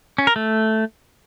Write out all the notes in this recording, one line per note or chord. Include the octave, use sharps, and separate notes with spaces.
C#4
A#4
A3